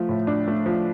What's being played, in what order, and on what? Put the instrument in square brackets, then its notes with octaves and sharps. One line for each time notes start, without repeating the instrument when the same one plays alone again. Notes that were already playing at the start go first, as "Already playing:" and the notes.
Already playing: [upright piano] F3 A3
A2
D4
A3
F3